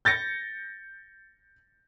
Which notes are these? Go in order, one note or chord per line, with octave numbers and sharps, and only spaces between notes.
G6 A6 A#6 C#7